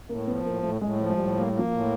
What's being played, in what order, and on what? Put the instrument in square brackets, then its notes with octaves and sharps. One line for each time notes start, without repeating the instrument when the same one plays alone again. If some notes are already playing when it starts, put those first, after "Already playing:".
[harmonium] A2 [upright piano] A#3
[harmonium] F3 [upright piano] B3
[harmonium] A2 [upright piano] A#3
[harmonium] A2 [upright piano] A3
[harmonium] A2 [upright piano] G#3
[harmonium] F3 [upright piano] G#3
[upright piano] G#3
[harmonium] A2 [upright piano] G3
[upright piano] G3 [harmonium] A#3
[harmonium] A#3
[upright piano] F3
[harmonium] A2